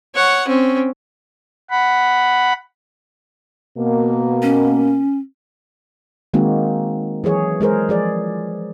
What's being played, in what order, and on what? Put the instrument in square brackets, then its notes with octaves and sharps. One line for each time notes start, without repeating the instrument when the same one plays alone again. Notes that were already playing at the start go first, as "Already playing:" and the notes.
[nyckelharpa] C#5 F#5
C4 C#4
[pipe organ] F#5 B5
[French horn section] B2 A#3
[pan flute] C#4
[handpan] D#3 G#3 A#3 C4 D#4 F#4
E3 F#3 G#4 C#5
G#3 G#4 A#4 C5
F3 G#4 D5